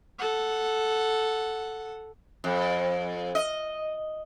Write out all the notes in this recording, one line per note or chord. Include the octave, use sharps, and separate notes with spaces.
A4 F#5
F2
D#5